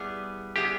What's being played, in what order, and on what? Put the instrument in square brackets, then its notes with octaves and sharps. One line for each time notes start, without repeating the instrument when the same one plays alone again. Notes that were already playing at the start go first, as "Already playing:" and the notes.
Already playing: [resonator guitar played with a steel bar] G3 B3 E4 G#4
[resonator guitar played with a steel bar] G3 B3 E4 G#4 [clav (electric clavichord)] G4